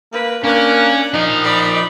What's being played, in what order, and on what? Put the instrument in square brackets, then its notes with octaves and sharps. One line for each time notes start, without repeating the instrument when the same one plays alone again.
[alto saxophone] A#3 [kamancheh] B4
[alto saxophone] A#3 [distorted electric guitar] C#4 [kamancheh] D4 F#6
[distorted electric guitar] F3 A#4 [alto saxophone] D#4
[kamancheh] D5 B5